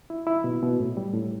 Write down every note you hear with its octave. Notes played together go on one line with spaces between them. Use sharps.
E4
E4
B2
B2
A2
G3
A2